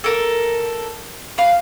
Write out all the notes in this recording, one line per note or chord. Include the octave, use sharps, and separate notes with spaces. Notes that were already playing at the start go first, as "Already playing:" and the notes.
A4 A#4
B4 F5